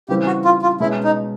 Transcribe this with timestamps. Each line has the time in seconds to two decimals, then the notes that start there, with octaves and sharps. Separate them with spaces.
0.09 C#3 E3 G3 C4 G4
0.26 F#4
0.45 F4
0.62 F4
0.80 B2 G#3 C#4 E4
1.04 D#4